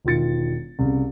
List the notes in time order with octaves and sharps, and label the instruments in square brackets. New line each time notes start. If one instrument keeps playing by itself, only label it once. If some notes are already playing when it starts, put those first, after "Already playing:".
[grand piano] E1 D#3 F4 A6 C#7
C2 C#3